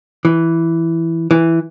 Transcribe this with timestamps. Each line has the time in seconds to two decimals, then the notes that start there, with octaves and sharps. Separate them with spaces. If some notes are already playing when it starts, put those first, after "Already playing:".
0.25 E3
1.31 E3